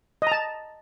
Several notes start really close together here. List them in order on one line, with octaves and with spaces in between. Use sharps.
D#5 A#5 A5